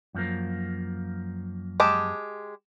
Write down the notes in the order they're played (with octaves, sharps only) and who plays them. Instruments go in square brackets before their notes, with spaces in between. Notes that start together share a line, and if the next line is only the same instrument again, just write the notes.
[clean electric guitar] F#2 F3 A#3
[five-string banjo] G#3 G4 A5